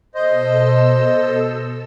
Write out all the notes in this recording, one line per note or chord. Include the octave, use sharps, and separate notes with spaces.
B2 A4 C5 D#5 E6